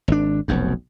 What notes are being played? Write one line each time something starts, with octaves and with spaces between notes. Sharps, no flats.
G#1 D4
F1 B1 F#2